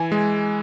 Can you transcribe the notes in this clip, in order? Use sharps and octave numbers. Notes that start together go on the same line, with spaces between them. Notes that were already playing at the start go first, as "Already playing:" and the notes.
Already playing: E3 G#5
G#3